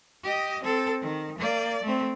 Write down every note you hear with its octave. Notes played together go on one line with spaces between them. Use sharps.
G4 D#5
C4 A4
D#3
A#3 D5
A3 C4